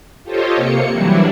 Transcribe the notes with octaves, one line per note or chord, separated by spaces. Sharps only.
F4 G4 A4 C5 C#5 D#5
C3 A#3 C#7
E3 F#3 G3 D4 E4